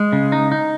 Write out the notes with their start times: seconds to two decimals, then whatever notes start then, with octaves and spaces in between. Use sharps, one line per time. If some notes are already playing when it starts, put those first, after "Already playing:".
Already playing: G#3
0.13 C#3
0.32 D#4
0.52 D#4